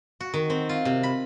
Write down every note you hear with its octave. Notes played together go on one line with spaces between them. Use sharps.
F#4
D#3
C4
F4
C3
B5